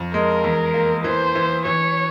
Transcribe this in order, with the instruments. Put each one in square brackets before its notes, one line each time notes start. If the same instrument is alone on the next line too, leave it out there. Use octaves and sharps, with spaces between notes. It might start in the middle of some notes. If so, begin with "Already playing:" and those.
Already playing: [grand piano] F2
[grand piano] G#3 [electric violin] A#4
[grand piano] E2
A#3
[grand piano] E3 [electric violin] C5
[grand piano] E3
[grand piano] E3 [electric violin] C#5